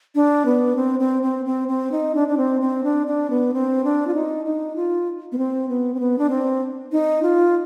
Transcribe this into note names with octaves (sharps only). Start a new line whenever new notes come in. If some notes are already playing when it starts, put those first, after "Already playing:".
D4
B3
C4
C4
C4
C4
C4
D#4
D4
D4
C4
C4
D4
D4
B3
C4
D4
F4
D#4
D#4
F4
B3
C4
B3
C4
B3
D4
C4
D#4
F4